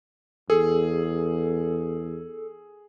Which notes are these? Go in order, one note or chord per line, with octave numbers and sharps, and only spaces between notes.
E2 G#4 A4